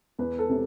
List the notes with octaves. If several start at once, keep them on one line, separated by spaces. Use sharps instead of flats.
E2 B4
A4
C3